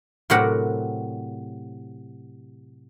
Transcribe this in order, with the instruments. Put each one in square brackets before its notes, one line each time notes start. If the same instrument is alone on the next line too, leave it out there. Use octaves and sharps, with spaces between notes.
[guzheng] A2 C3 F#3 G4 A#4 F#5